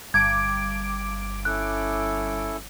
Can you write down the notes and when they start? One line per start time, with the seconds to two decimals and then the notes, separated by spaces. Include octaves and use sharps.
0.14 G1 D6 G#6 D7
1.45 C#4 E4 A4 F#6